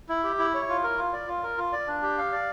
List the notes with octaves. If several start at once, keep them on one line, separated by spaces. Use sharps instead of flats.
E4
G4
E4
C#5
F4
A#4
F4
D5
F4
A#4
F4
D5
D4
G4
F5
D5